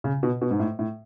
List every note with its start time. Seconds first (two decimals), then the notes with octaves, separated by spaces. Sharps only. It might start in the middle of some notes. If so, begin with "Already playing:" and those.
0.04 C#3
0.23 B2
0.42 B2
0.51 G#2
0.60 A2
0.79 A2